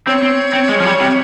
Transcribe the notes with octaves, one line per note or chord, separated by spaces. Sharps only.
C4 C#5
C4
C4
G#3
F3
G3
C3